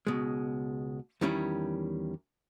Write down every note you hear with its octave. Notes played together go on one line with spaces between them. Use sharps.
C#2 B2 G#3
E2 D#3 G3 C#4 E4